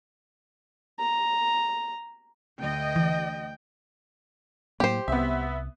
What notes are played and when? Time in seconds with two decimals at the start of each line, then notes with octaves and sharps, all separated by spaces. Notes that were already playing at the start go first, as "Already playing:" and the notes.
0.99 A#5
2.60 D2 D#5 G5
2.96 E3
4.80 A2 F#3 A#3 G4 C5
5.08 C2 B3 E5